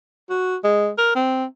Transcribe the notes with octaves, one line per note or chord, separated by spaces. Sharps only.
F#4
G#3
A#4
C4